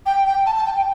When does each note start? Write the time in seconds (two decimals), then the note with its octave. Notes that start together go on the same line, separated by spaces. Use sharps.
0.06 G5
0.27 G5
0.46 A5
0.56 A5
0.66 G5
0.76 G5